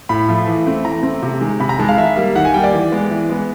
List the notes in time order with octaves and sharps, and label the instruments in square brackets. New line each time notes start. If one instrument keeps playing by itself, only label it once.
[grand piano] A2 B5
F3 A3
E3
A3 C4
E3 A#5
A3 C4
C3
D#3 G#3
C3 B5
A#5
D#3 G#3 A5
F5
D#3 E5
G3 A#3
D#3 F#5
G#5
G3 A#3 G5
D5
E3
G#3 B3
E3
G#3 B3